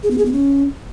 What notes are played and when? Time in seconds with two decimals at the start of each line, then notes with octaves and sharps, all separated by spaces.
0.03 G#4
0.11 B3
0.18 G#4
0.25 B3
0.33 C#4